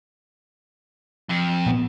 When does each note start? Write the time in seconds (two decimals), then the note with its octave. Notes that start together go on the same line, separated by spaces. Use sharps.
1.29 F2
1.66 A#2 B3